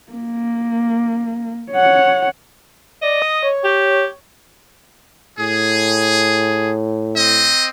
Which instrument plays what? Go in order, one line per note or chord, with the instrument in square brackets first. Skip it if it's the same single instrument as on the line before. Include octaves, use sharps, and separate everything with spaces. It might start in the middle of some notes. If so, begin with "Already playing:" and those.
[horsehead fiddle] A#3
C#5 F#5
[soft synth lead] D5 [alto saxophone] D#5
[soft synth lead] D#6
C#5
[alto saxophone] G4
[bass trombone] A2 [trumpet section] G#4
[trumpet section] C4 D#5